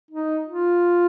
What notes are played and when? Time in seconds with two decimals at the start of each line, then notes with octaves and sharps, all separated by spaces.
0.11 D#4
0.48 F4